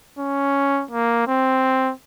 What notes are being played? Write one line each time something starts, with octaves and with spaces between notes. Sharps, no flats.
C#4
A#3
C4